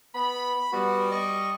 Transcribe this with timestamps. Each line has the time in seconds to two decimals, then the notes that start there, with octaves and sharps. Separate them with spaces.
0.14 B3 B5
0.72 G3 B3 F#4
1.11 D#5 C#6